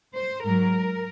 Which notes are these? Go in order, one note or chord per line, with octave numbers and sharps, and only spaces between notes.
C5
G#2 F#3 A#4